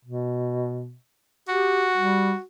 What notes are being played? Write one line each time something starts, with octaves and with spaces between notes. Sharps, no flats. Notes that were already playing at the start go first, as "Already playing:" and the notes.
B2
F#4 G4
G3